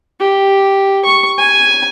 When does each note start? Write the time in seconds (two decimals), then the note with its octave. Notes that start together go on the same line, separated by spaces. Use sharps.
0.20 G4
1.05 C#6
1.38 G#5